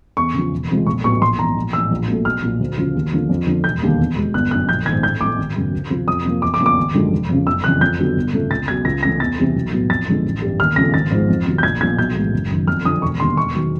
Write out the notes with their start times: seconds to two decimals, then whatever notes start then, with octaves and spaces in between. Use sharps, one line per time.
0.17 E2 C#6
0.34 C#3 F3
0.52 E1
0.69 E2 C3 F3 G#3
0.86 A#1 C#6
1.04 A2 F#3 B3 C#6
1.21 A#1 C6
1.39 G#2 E3 A#5
1.56 A#1
1.73 A2 E3 E6
1.91 A#1
2.08 A#2 F#3 A3
2.25 B1 F6
2.42 A#2 F3
2.60 D2
2.78 C#3 F3
2.95 D#2
3.12 D3 F3 A#3
3.29 F2
3.47 D3 F3
3.64 E1 G6
3.82 D#2 D3 G3 A#3
3.99 E2
4.16 B2 G#3
4.34 G1 F#6
4.51 F#2 F#6
4.54 D3
4.69 A#1 G6
4.86 G#2 D#3 G#6
5.03 A1 G6
5.21 A2 F3 A3 D6
5.38 G#1
5.56 F#2 C#3 F#3
5.73 D2
5.90 C3 F3
6.07 F2 D#6
6.25 C3 F3 A#3
6.42 E2 D6
6.54 D6
6.59 C#3 F3 A#3
6.66 D6
6.77 G#1
6.94 F#2 D3 F3 G#3
7.12 F1
7.29 F2 C#3
7.47 F#1 E6
7.64 E3 F#6
7.66 F2 C#3
7.81 F2 G6
7.99 D3 F#3 B3
8.16 G1
8.33 F2 C#3 F3 A3
8.50 C#2 A6
8.68 B2 F#3 B3 G#6
8.85 C#2 A#6
9.03 C3 E3 A3 A#6
9.20 E2 A6
9.38 C3 E3 G3 B3
9.55 B1
9.72 A2 F#3 B3
9.89 F2 A6
10.07 D3 F3 G#3 B3
10.25 A1
10.42 G2 E3 G3
10.60 D#2 F6
10.76 C#3 F3 A3 A#6
10.94 G#1 A6
11.11 G#2 F3 G#3
11.29 F2
11.46 C3 D#3 F#3
11.58 G6
11.63 A#1 G#6
11.81 A#2 F3 G#6
11.98 B1 G6
12.16 A2 E3 G#3 B3
12.33 F#1
12.50 F#2 D#3
12.67 F2 F6
12.84 D3 F3 D#6
13.02 E1 C#6
13.19 D#2 D3 G3 C6
13.37 E1 C#6
13.54 D#3 F#3 B3